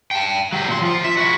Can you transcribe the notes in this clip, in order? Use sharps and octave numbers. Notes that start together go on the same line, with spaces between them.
G5 A5
F#3 G4
A#2 C6
F3 F4
E5
E4 F#4